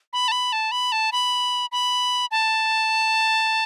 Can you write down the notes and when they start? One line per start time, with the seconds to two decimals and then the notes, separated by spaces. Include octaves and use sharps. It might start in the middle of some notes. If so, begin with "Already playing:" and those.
0.13 B5
0.28 A5
0.32 B5
0.52 A5
0.71 B5
0.92 A5
1.12 B5
1.72 B5
2.31 A5